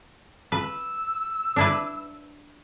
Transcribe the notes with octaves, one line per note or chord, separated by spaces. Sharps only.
B4 E6
D4 E4 B4